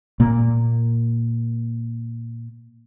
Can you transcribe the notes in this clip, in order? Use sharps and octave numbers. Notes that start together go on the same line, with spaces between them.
A#2 A#3